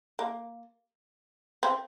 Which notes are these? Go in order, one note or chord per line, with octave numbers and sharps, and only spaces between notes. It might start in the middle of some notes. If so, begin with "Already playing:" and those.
A#3
C4